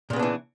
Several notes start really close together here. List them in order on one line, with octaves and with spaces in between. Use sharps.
A#2 C#3 B3 D4 E3